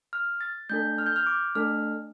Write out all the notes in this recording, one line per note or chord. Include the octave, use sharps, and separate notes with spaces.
F6
A6
A3 D4 A4 G6
F6
G6
F6
D6
A3 D4 A4 F6